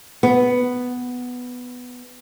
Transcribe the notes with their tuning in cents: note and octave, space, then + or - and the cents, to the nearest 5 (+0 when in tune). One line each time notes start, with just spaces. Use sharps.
B3 +5